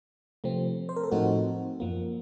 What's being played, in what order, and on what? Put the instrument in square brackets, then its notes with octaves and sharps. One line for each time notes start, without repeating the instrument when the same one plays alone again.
[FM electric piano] C3 F3 A3 C4
C5
A#4
A4
A2 F3 A3 C4 D#4 F#4
F#2 F3 A#3